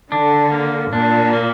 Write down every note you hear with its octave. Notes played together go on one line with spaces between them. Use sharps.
D3 D4
A#3
A#2 D4
A#3